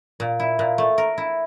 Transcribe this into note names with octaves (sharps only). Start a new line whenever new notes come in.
A#2
E4
A#2
A3
A#4
E4